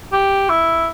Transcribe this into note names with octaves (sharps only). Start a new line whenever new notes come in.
G4
E4